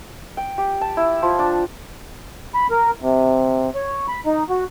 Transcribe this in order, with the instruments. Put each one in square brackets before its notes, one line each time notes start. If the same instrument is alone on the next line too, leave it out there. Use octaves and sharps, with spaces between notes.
[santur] G5
G4
A5
E4
F3
D4
[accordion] B5
A#4
C3
C#5
B5
D#4
F#4